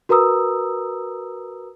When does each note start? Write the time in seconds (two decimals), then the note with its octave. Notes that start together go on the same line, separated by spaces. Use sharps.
0.09 F#4 A#4 B4 A#5 D#6 E6